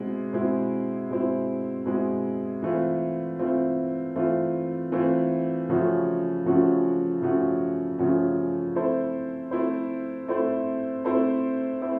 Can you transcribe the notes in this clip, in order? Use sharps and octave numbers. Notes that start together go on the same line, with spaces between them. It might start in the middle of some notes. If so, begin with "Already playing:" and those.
Already playing: B2 G#3 C4 E4
B2 G#3 C4 E4
B2 G#3 C4 E4
B2 G#3 C4 E4
E3 A3 C4 F4
E3 A3 C4 F4
E3 A3 C4 F4
E3 A3 C4 F4
C#3 F3 A3 C#4 F#4
C#3 F3 A3 C#4 F#4
C#3 F3 A3 C#4 F#4
C#3 F3 A3 C#4 F#4
A3 C4 E4 A4 C5
A3 C4 E4 A4 C5
A3 C4 E4 A4 C5
A3 C4 E4 A4 C5
A3 C4 E4